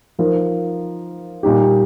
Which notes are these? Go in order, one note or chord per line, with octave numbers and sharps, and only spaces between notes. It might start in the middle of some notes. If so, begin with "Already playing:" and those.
F3 D#4 A#4
A#2 G3 D#4 G4